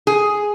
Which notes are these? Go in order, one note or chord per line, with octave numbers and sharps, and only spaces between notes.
G#4